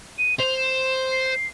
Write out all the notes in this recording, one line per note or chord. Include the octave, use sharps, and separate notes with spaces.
D#7
C5 F7
E7
C7